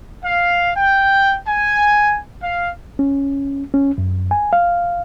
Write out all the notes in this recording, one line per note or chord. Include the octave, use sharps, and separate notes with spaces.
F5
G5
G#5
F5
C#4
C#4
F#2
G#5
F5